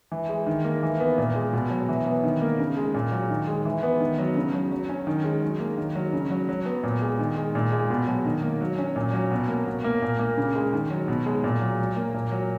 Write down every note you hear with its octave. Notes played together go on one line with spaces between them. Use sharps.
E3
G#3
D#3
A#3
E3
B3
A#2
G#3
B2
F#3
E3
B3
D#3
A#3
C#3
G#3
A#2
F#3
D#3
G#3
E3
B3
D#3
F#3
C#3
F#3
F#3
C#4
D#3
G#3
F#3
A#3
D#3
F#3
C#3
F#3
F#3
B3
A#2
G#3
D#3
G#3
A#2
G#3
B2
F#3
D#3
A#3
F#3
C#4
A#2
F#3
B2
A#3
B2
A#3
A#2
A#3
C#3
G#3
D#3
F#3
B2
G#3
A#2
F#3
F#3
A#3
A#2
F#3